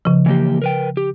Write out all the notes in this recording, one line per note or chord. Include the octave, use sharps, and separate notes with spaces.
C#3 F3
E3 A#3 G4
A#4 B4 G5
G4